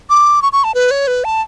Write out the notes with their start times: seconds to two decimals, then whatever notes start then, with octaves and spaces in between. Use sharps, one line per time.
0.10 D6
0.42 C#6
0.53 C#6
0.64 A5
0.74 B4
0.91 C#5
1.07 B4
1.24 A5